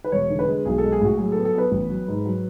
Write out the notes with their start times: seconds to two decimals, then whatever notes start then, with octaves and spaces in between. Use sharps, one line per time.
0.04 B4
0.12 E1 C#5
0.30 D3
0.39 B4
0.48 G#3
0.66 B1 G#4
0.78 A4
0.84 G#3
0.92 G#4
1.01 A2 F#4
1.18 F#3 G#4
1.32 B3 A4
1.45 A4
1.55 B3 B4
1.72 A1
1.90 F#3
2.08 G#2
2.25 F#3